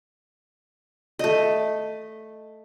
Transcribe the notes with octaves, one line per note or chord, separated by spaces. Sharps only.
A3 D#5